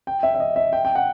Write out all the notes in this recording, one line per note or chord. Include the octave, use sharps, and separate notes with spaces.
G5
E5
E5
D#5
E5
G5
G5
F#5